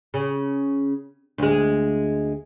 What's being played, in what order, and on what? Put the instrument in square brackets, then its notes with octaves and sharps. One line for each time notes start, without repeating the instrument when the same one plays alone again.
[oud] C#3
D2 G#3